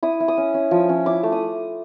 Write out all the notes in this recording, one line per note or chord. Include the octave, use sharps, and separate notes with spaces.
E4 D#6
E4
D#6
C#4
C#4
F3
C#4
E4 D6
A3
D#6